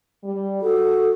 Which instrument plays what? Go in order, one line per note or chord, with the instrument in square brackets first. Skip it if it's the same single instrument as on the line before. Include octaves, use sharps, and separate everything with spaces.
[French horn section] G3
[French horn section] F#4 [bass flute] A4